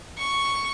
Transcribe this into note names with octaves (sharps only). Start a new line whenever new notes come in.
C#6